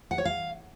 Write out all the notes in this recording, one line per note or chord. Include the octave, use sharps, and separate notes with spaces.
F#5
C#5
F5